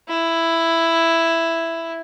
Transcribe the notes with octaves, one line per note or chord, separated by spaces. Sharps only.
E4